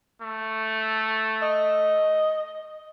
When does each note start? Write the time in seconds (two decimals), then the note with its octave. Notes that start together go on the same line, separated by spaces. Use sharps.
0.22 A3
1.42 D#5